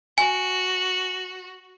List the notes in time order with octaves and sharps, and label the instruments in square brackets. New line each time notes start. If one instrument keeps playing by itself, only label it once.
[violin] F#4 [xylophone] G#5